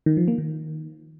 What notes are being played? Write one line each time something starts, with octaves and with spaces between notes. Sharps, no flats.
D#3
F3
A#3
D#3